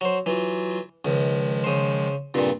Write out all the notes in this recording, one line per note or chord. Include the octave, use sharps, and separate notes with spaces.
F#3 C5
E3 F#3 F4 F#4
C#2 D#3 F3 G#3
C#3 C5
G2 A#2 C#3 C4 F4